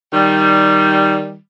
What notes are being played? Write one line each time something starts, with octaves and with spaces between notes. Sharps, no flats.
D#3 G3